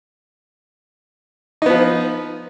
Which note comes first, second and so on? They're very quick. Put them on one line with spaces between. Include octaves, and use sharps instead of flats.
D#4 B3 F3